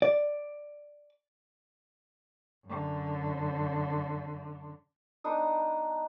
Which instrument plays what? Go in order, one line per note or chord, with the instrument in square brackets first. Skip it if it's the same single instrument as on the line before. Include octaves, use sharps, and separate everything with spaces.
[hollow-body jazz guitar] D5
[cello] F#2 D3
[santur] B3 D4 D#4 D#6